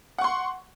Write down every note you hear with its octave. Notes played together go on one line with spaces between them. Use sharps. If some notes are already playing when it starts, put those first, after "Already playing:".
F#5 C6 C#6